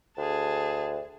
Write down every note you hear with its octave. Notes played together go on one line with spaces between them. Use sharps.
D2 G#4 A5